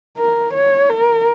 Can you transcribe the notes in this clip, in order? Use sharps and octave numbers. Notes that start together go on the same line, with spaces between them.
A#4
C#5
A#4